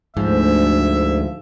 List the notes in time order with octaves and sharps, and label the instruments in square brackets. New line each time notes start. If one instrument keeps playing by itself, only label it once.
[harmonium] D2 [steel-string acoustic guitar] G#2 F3 [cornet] E5